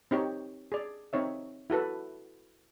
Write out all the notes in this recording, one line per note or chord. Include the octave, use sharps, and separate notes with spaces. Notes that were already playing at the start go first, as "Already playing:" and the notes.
C4 D#4 G4 C#5
G#4 D5
C4 D#4 C#5 E5
E4 F#4 A4 B4